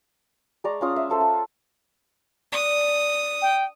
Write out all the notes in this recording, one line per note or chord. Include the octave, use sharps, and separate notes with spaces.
G#3 D5 A#5 C#6
C#4 F4 D#6
E5
F4 A4 C5
F4
D4 D#6
G5